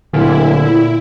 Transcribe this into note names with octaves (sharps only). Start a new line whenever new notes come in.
D1 A#2 D3 E4